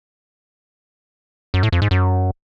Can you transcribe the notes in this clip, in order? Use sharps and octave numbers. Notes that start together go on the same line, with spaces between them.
F#2
A2
F2
G#2
F#2